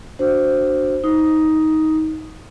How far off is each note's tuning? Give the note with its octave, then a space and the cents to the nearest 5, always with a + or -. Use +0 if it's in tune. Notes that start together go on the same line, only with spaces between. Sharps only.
D4 +0 F#4 +0 C5 +0
D#4 +15 D#6 +5